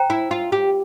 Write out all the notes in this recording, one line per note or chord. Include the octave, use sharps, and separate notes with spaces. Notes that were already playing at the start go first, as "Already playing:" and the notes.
Already playing: C5 G5 A#5
E4
F4
G4